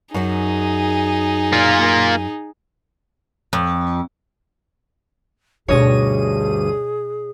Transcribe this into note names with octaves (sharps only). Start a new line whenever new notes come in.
F#2 F#3 D#4 G#4
A#3 F4
F2
D2 G2 B2 D#4 G#4 C#5 D#5 D#7